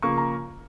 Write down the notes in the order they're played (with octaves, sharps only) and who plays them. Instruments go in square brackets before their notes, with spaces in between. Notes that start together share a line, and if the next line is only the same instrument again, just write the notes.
[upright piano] C#3 F3 A#3 C#6
A#5